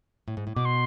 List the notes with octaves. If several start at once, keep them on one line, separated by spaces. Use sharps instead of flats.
A2
G#2
A2
B2 D6
C6